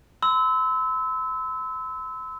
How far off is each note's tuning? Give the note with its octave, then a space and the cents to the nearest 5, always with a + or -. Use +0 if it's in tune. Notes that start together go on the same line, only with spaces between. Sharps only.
C6 -40 E6 -20